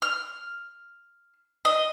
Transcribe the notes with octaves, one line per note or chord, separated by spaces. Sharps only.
F6
D#5